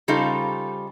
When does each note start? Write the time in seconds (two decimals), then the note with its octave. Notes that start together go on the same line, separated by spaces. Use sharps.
0.08 C#3 G3 D#4 F4 A4 C5